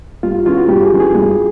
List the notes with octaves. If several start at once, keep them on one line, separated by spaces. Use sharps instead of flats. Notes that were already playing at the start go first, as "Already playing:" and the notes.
G2 F4
F4
E3 G#3 C#4 F4
F#4
G2 G4
G#4
E3 G#3 C#4
G#4
G2